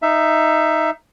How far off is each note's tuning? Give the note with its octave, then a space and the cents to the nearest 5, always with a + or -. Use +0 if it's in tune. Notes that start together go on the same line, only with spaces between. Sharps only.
D#4 +0 E5 +15